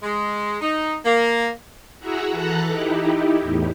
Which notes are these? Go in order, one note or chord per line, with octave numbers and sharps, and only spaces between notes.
G#3
D#4
A#3
E4 F#4 G#4 E5 F#5 A#5
E3 A4 A5 A#5 F#6
D#4 E4 G4
E2 A2